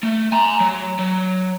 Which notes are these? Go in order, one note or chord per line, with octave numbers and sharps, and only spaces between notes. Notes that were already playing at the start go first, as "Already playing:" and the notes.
A3
G#5 A#5
F#3
F#3